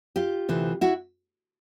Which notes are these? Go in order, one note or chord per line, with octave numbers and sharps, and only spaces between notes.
F4 G4
D2 C3 E3
E4 F#4